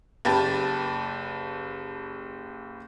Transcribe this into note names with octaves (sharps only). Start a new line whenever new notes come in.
F#1 G4 B4 A5 A6